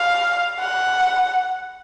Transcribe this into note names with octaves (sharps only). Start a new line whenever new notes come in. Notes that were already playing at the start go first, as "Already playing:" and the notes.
Already playing: F5
F#5